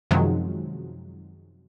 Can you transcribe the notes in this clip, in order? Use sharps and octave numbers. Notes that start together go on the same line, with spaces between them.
F#2 C3 D#3 F3 F#3 G#3